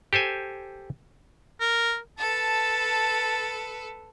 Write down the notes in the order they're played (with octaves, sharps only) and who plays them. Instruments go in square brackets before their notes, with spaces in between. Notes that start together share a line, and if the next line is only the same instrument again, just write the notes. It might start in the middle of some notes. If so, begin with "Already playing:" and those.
[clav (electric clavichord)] G4 A4 C5 G#5
[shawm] A#4
[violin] A4 B4 [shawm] A5